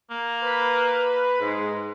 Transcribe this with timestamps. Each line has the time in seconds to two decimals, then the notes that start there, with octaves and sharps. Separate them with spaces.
0.11 A#3
0.43 B4
1.39 G#2 G#3